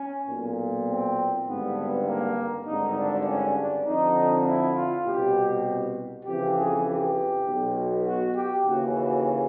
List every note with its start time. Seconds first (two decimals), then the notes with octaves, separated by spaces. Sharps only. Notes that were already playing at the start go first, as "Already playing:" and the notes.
Already playing: C#4
0.27 B1 A#2
0.87 C4
1.47 G#1 G2 D3 B3
2.06 A#3
2.66 G#1 G2 D3 D#4
2.96 D4
3.26 C#4
3.55 D4
3.86 F2 D3 D#4
4.46 E4
4.75 F4
5.05 C2 B2 G4
6.25 F2 C#3 E3 G4
6.54 G#4
6.85 G4
7.45 B1 B2
8.04 F#4
8.34 G4
8.64 D#2 C#3 E3 F#4
8.94 F#4